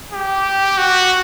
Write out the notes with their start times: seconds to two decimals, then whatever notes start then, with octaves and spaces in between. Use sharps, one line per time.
0.13 G4
0.78 F#4